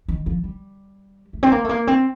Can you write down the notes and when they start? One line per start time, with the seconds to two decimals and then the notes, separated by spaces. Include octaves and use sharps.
0.08 D#3
0.26 F3
0.44 G3
1.33 A3
1.43 C4
1.52 A#3
1.64 A3
1.69 A#3
1.87 C4